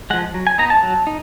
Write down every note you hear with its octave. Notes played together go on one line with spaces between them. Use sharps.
F3 G#3 F#5
F#3
G#5
B3 D#4 A#5
A5
F#3
D#4